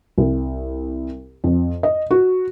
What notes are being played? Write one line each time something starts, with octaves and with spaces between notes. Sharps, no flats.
C2
F2
D#5
F#4